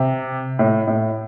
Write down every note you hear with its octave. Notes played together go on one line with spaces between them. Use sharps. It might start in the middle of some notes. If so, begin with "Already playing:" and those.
Already playing: C3
A2
A2